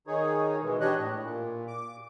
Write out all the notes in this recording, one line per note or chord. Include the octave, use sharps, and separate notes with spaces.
D#3 D#4 G#4 C#5
B2 E3 G#3
D4 G4 C#5 D#5 F#6
A2
A#2
D6